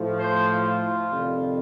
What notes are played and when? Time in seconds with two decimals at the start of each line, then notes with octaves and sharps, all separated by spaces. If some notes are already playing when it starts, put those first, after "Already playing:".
Already playing: A2 F3
0.18 C5
0.49 F4
1.08 F2 C3 D#3 G3